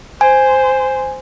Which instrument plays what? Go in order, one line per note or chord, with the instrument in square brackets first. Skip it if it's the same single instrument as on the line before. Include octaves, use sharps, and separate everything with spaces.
[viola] C5 [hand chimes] G#5